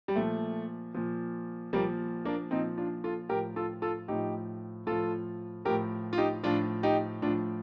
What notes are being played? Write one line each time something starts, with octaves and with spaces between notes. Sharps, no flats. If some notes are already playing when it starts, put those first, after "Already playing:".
G3
A#2 F3 A3
A#2 F3
A#2 F3 G3 A#3
A#3 D4
A#2 F3 C4 D#4
D4 F4
F4 A4
A2 F3 G4 A#4
F4 A4
F4 A4
A2 F3 D#4 G4
A2 F3 F4 A4
A2 F3 G4 A#4
F4
D#4 G4
A2 F3 D4 F4
D#4 G4
A2 F3 D4 F4